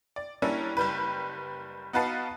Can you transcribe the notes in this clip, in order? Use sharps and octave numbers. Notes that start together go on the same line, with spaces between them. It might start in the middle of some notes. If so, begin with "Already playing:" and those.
D5
G3 A#3 C#4 D4 E4
F#1 G3 B4
B3 D#4 F#4 B4 F5 A5